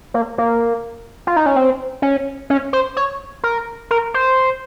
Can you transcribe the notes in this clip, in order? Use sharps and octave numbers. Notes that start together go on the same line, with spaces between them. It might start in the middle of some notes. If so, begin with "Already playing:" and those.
A#3
A#3
F4
D#4
C#4
C4
C#4
C#4
C5
C#5
A#4
A#4
C5